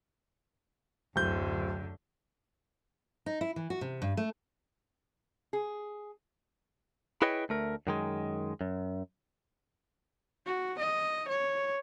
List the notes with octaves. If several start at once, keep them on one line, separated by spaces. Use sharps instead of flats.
D1 F#2 D3 G6
D#4
E4
E3
F#4
C3
G2
A3
G#4
E4 G#4 B4 C#5 D#5 G5
D2 A3 A#4
F#2 D#3 G#3
F#2
F#4
D#5
C#5